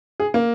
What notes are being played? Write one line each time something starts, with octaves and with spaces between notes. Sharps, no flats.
G#4
A#3